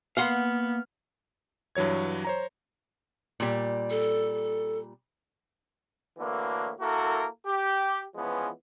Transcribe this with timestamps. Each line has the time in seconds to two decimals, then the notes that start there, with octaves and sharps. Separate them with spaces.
0.17 A#3 B3 F5 F#5 C6 F6
1.75 G2 E3 F#3 C#5 G#6
2.25 C5 C#5 A#5
3.40 A#2 G3
3.90 A4
6.18 A2 D3 E3 A#3 F#4
6.80 A#3 E4 F#4 A4 A#4
7.46 G4
8.15 E3 F3 G#3 B3 C#4